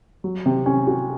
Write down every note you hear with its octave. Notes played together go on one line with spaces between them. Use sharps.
F#3
C3
C#4
F#4